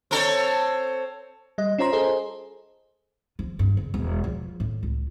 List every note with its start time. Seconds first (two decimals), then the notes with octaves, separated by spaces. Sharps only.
0.11 C4 A4 C#5
1.58 G3 D#5
1.79 C#4 F4 C5 A#5 C6
1.92 G#4 A4 C5 D#5
3.39 F3
3.59 G2
3.77 C#3
3.94 E1
4.24 F3
4.60 A2
4.83 C#2